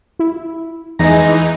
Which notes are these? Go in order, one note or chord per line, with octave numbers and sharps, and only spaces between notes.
E4
E2 E3 G#3 D#4 A#5